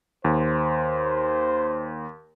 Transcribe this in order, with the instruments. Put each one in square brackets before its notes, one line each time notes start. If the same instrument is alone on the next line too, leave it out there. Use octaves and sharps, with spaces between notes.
[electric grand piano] D#2 [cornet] C5